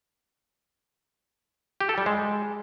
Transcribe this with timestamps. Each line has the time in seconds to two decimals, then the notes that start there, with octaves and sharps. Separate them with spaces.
1.81 G4
1.89 A4
1.98 G3
2.06 G#3